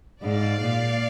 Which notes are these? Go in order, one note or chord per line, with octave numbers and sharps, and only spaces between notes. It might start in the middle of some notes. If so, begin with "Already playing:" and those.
G#2 D5 F5
A#2